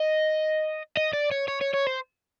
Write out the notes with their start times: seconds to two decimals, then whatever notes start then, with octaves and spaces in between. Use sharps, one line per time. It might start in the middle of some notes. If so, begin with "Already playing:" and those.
Already playing: D#5
0.97 D#5
1.13 D5
1.31 C#5
1.48 C#5
1.61 C#5
1.73 C#5
1.86 C5